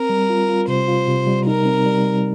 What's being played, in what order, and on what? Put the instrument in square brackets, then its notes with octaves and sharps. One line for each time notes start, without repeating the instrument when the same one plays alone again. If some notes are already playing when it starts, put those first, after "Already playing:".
Already playing: [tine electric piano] C4 [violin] A#4
[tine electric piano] G3
F4
F4
[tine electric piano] C3 [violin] C5
[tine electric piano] F4
C3
G3
[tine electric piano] D#4 [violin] A#4
[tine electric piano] C4
G3
G3